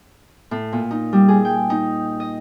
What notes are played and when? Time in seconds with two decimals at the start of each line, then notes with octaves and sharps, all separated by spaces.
0.51 A2
0.72 A#2
0.91 D#4
1.13 G3
1.28 G#4
1.45 G5
1.70 D#4
2.20 D#5